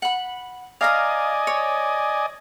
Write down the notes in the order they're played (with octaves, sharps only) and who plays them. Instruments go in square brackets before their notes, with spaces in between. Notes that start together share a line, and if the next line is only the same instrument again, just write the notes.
[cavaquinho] F#5 B5
[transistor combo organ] D5 D#5 G#5 [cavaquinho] F5 A#5 D#6
[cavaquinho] C#5